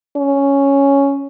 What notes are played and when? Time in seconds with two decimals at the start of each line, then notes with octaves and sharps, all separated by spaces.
0.17 C#4